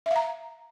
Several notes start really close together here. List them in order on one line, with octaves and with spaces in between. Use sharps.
E5 F5 A#5